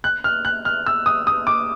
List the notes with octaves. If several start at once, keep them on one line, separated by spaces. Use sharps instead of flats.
F#6
F6
F#6
F6
E6
D#6
D#6
D6